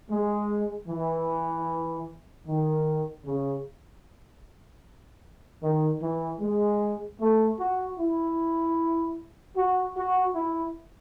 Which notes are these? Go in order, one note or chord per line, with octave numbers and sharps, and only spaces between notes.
G#3
E3
D#3
C#3
D#3
E3
G#3
A3
F#4
E4
F#4
F#4
E4